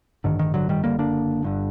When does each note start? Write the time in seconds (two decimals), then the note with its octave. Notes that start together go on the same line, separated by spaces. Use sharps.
0.24 A1 G2 D3 D#3
0.39 D#3
0.54 D3 F#3
0.69 D#3 G3
0.84 F#1 F#2 D3 G3 A#3
0.99 A#3 D4
1.43 G1 G2 D3